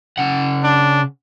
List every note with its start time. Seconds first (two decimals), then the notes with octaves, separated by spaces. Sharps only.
0.18 C#3 F#5
0.64 D4